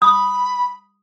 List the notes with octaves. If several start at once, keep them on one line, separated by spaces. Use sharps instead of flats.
B5 D#6